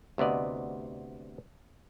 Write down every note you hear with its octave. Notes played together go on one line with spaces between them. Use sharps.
D2 C3 B3 D5 D#5